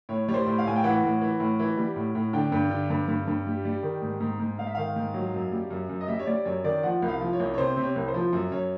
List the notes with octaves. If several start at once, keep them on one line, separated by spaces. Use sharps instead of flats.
A2 C#5
G3 C#5
C5
A2
F5
A2 G#5
G5
E3 F#5
A2
E3
A2
E3
G3
A2
A2
D3 G5
G2
D3
G2
G2
G2
G3
G3
D#3
G#2
G#2
G#2
G#2 F5
E5
D#3 F5
G#2
F#3
F#2
G3
F#2
F#2
D#5
G3 E5
C#5
G3 D5
F#2 C#5
D#3 D5
F3 F#5
C2
F5
F3
C#5
C2
C#5
C3 C5
C3
C#5
C2
C5
F3
F#2
F#2 C#5